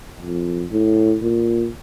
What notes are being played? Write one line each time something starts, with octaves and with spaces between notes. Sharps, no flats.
F2
A2
A#2